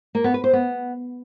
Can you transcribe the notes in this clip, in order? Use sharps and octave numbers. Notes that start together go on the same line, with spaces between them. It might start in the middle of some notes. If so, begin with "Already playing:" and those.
A#3
B3
B4
C5
B3